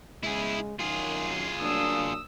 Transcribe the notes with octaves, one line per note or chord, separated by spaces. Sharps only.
C#3 G#3 E4 G#4
F#2 D#3 F#3 F4 G#4
F#3 A#3 D4 D#6 E6